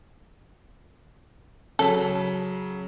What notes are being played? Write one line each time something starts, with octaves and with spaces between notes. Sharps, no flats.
C#3 F#3 A4 B6